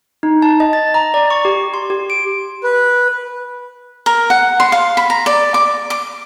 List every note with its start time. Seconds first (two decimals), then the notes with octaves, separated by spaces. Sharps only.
0.23 D#4
0.42 A5
0.60 D#5
0.73 A6
0.94 A#5
1.14 D5
1.30 C#6
1.45 G4
1.74 C6
1.90 G4
2.10 D7
2.64 B4
4.06 A#4
4.30 F#5
4.60 C6
4.72 F5
4.97 B5
5.10 A#5
5.26 D5
5.54 D6
5.90 D6